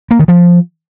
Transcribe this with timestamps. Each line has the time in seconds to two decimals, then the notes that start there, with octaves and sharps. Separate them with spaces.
0.11 A#3
0.19 D#3
0.28 F3